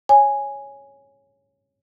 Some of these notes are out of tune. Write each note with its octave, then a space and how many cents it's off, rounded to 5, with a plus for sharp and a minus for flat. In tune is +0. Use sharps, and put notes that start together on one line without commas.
C#5 +0 G#5 +0